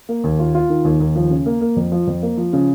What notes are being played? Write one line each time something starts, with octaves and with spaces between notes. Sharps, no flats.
A#3
D#2
F4
F4
D#3
D#2
D#2
F3
C#3
A#3
A#3
F2
F3
F2
A#3
F3
C#3